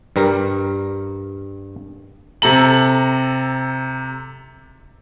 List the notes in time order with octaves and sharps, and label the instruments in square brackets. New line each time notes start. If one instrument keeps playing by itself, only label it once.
[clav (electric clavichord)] G2 G3 A#4
[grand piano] C3 A4 A#5 F#7